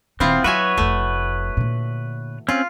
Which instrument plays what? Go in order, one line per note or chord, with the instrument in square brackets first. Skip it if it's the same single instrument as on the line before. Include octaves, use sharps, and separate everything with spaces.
[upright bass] D#1 D#3 [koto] B3 E4 F4 [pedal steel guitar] C4
[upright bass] F#3 [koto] F#4 E5 G#5 [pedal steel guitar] B4 C#5
[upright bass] F1 F2 [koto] A3
[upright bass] A#2 D3
[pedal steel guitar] C4 C#4 [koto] F4